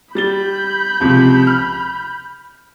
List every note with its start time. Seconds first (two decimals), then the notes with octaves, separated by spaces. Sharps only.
0.15 G3 B5 G6 A6 G7
1.00 C#2 C3 F3
1.47 F6